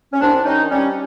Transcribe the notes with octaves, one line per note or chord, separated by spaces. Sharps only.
C#4
C2 C4 D4
D4
D#3 C#4 D#4
G3 C#4